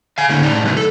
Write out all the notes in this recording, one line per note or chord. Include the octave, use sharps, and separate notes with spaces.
F5 G#5
D3 A#3 C#4 D#4
A2 D4 D#4
C#3 F#3 B3 E4
A4